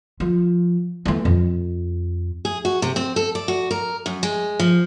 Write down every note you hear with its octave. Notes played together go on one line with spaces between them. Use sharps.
F3
E3 A3
F2
G#4
F#4
C3
C4
A4
D5
F#4
A#4
F#2
G#3
F3